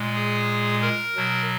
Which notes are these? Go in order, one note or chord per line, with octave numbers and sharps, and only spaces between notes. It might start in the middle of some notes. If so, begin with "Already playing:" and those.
Already playing: A#2 G#3
G#4
A#4
B2 F#3